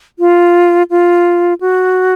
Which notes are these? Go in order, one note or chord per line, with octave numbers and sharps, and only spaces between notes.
F4
F4
F#4